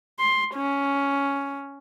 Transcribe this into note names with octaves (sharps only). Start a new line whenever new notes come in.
C6
C#4